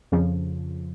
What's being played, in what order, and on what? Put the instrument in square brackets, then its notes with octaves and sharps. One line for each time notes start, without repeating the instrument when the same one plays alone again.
[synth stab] F2 C#3 F3